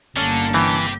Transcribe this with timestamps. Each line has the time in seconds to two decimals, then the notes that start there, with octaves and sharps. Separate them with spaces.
0.17 G1 D3 A#3 C#4 D4 A4
0.54 E3 C4 G4